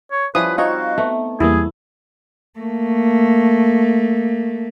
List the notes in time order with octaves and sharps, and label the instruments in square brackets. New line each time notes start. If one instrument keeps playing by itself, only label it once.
[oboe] C#5
[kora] F3 G3 C#4 [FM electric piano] E4 F4 [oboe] B4 [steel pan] D#6
[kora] C4 D#4 C#5 [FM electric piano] F4 D#5 F5 [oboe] F#4
[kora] A3 [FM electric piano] B3
[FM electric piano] E2 G3 A#3 [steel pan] E4 [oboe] G#4
[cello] A3 A#3